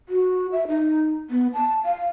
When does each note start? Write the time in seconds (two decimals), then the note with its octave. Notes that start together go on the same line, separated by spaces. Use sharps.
0.09 F#4
0.52 E5
0.68 D#4
1.30 B3
1.53 A5
1.85 F5